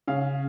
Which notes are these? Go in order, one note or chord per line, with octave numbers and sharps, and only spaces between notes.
C#3 F5